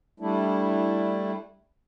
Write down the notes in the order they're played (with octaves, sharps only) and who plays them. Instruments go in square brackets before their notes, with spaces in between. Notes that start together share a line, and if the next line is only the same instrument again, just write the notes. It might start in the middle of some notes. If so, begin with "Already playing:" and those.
[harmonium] G3 A3 D4 E4